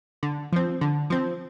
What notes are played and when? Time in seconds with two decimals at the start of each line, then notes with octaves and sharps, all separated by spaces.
0.23 D3
0.52 F3 C4
0.81 D3
1.10 F3 C4